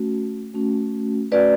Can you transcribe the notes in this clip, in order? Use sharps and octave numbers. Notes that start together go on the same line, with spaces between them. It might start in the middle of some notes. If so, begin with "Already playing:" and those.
Already playing: A3 C#4 F#4
A3 C#4 F#4
A3 C#4 F#4 B4 D5